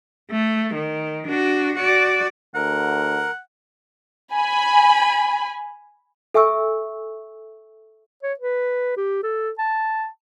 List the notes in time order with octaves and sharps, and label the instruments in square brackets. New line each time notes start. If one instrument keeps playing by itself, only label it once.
[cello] A3
D#3
D4 F#4
F#4 D5
[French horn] D2 [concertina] A#4 [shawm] F#5
[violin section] G#5 B5
[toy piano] A4 E5 G#5 C#6 E6
[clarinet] C#5
B4
G4
A4
A5